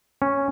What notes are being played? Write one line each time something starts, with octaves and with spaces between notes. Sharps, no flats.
C#4